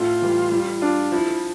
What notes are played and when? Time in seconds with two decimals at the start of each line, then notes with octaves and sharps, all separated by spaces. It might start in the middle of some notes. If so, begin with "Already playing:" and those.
Already playing: A2 F4
0.22 E3 G3
0.52 G3
0.82 D4 F4
1.12 F3 E4